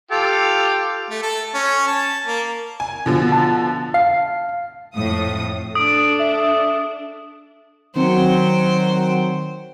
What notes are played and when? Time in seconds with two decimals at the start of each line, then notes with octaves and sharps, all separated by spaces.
0.11 F4 G4 A4
1.10 A3
1.22 A4
1.54 C#4
1.87 A5
2.26 A#3
2.80 G#5
3.06 B2 D3 F3
3.32 A5
3.94 F5 C7
4.95 F2 A2 D#6
5.75 D4 A4 D#6 D7
6.19 E5
7.95 D#3 F#3 C4 C5 G5 C#7